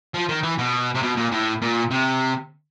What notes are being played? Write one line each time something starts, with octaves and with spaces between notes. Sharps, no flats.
F3
D#3
E3
B2
C3
B2
A#2
A2
A#2
C3